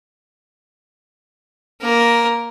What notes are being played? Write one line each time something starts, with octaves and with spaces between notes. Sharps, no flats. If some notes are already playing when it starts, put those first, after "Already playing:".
A#3 A#4